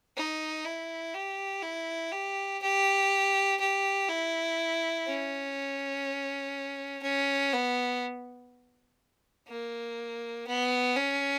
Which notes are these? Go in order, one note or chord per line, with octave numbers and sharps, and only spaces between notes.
D#4
E4
G4
E4
G4
G4
G4
E4
C#4
C#4
B3
A#3
B3
C#4